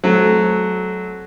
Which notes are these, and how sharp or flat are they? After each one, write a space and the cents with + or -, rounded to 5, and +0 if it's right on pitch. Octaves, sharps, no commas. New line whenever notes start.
F#3 +0 A3 -30 C4 +0